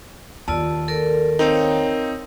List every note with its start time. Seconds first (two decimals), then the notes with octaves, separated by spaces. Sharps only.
0.48 D#2 F4 D5 A5 E6
0.88 A4 A#4 D5
1.39 C4 D#4 A#4 C#5 F5 G5